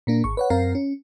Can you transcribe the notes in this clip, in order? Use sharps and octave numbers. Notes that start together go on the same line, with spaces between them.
A#2 A#3 D4
G#1 C#6
B4 C#5 F#5
F#2 C4 A#4 F5 A#5 C7
C#4